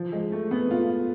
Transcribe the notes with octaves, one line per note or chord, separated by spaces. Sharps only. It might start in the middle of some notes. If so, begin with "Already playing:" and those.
Already playing: F3
G#3
A3
B3
F4